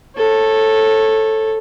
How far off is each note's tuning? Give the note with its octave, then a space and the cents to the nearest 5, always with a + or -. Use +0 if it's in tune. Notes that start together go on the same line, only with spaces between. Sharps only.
A4 +0 C#5 -25